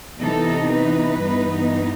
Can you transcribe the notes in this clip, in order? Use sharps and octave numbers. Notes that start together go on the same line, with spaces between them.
C3 E3 B3 D#4 A4
B4
G2 E3 B3 D#4